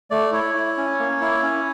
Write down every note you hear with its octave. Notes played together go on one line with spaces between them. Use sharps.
A3 D5
E4 C#5
E4
C#4
A#3
E4
C#4